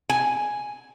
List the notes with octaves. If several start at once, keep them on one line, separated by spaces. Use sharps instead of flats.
G#5